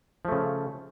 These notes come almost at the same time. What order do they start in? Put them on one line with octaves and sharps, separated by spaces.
F3 A3 C#3